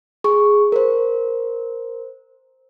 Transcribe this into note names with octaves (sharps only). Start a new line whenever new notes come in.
G#4 C#6
A#4 C5